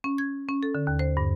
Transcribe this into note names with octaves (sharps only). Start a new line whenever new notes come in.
C#4
G#6
C#4
A4
D3
D#2
C5
G2